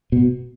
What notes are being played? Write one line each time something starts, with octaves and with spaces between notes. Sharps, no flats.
B2